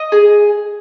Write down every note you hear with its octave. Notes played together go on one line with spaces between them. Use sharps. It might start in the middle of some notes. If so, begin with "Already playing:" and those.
Already playing: D#5
G#4